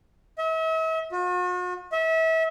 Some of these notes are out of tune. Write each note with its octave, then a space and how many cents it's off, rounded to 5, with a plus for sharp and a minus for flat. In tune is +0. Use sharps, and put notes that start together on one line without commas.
E5 -40
F#4 -45
E5 -30